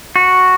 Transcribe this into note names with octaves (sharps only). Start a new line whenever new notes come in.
F#4